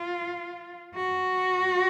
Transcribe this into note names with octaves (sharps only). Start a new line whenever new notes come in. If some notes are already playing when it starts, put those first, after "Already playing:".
Already playing: F4
F#4